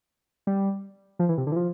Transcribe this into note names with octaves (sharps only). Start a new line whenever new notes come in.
G3
F3
E3
C3
D3
E3
F3